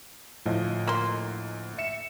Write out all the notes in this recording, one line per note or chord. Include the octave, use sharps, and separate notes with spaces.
D2 A2 F3 D#5
A#3 C6
E5 C#7 E7